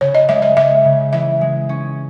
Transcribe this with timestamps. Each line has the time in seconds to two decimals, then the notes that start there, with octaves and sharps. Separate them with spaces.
0.01 C#3 C#5
0.15 D#5
0.29 G#3 E5
0.42 D#5
0.57 G#3 E5
0.85 C#3
1.13 E3 E5
1.41 G#3
1.69 C#4